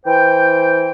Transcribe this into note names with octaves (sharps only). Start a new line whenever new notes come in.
E3 C5 G5